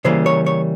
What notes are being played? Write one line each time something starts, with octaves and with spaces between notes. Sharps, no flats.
C#3 E3 G3 A#3 C5
C#5
C#5